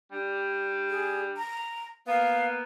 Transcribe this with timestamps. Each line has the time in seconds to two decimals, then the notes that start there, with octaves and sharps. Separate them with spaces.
0.12 G3 D4
0.90 G#4
1.37 A#5
2.07 A#3 B3 F5